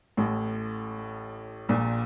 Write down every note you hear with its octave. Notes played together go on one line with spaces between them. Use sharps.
A1 A2
A#1 A#2